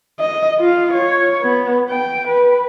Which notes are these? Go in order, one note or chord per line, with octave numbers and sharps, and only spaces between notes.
D#5
F4 F5
C#5
B3
G5
B4